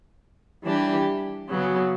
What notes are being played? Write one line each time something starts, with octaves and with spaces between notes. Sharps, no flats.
E3 G3 D4 G4
C#3 F#3 B3